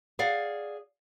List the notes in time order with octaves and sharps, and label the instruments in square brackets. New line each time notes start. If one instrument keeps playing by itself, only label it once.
[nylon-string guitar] G#4 D5 F5 F#5